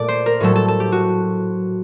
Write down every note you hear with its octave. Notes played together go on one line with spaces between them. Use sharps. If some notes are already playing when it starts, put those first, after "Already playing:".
Already playing: A#2 A3 D5
C5
A#4
A2 F#3 A3 A4
A4
A4
G4
F#4